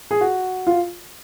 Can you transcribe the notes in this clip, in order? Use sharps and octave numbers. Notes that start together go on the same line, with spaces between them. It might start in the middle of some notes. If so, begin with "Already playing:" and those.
G#4
F#4
F4